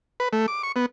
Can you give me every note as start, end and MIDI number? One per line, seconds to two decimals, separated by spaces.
0.20 0.28 71
0.33 0.46 57
0.48 0.62 86
0.63 0.72 85
0.76 0.86 59